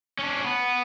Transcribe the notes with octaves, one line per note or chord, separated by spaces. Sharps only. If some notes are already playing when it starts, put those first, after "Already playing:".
C#4 D4
B3